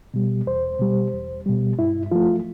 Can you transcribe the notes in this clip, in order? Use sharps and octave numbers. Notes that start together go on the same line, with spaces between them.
B2 G3
E2 C5
B2 G3
E2
B2 G3
G2 E4
F3 A3 F4